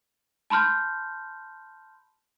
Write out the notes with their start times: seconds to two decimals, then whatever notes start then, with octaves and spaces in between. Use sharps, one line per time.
0.50 A5 B5 C6 F6 G6